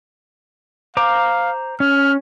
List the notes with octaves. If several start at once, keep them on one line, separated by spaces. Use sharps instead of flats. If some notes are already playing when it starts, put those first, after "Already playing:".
C5 F5 A#5 D6
C#4 F6